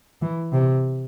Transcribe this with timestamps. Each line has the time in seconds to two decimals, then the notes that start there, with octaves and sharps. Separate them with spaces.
0.22 E3
0.52 C3